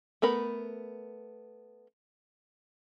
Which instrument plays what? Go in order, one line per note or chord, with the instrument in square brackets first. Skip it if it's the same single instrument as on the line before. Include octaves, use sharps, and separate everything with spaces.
[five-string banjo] A3 B3 A#4 B5